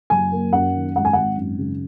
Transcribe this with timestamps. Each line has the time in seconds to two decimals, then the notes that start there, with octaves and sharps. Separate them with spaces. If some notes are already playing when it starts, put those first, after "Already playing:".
0.10 F#1 G#5
0.32 A#3
0.53 F#2 F#5
0.74 D#3
0.96 G#1 F#5
1.05 G#5
1.13 G#1 F#5
1.37 F#2
1.58 C#3